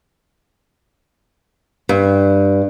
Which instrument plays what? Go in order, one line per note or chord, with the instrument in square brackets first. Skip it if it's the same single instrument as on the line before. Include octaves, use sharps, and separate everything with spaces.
[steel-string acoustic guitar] G2